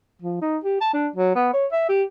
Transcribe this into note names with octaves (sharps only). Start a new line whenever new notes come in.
F3
D#4
G4
A5
D4
F#3
B3
C#5
E5
G4